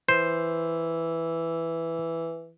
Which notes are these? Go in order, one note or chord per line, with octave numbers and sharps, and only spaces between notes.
E3 C5